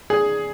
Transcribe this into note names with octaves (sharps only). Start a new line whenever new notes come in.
G#4